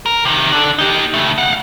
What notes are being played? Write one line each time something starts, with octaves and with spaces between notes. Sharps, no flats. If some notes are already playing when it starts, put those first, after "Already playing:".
A#4
C3 D#3
D4 A4
D#4 G4
C#3 A3
F5 F#5